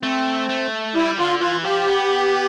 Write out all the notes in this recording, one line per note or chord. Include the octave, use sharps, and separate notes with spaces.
A3 C4
A3
G3 E4
D3 F4
E3 F4
F3 G4
B3